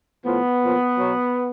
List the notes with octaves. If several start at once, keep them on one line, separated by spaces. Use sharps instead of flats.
A2 F3 B3
A#2 F3
B2 F#3